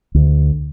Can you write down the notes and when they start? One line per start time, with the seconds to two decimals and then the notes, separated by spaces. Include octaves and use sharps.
0.15 D2